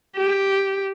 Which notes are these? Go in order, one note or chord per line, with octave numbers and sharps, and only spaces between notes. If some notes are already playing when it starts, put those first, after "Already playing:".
G4